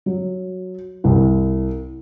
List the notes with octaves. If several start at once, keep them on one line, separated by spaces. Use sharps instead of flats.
F#3
C2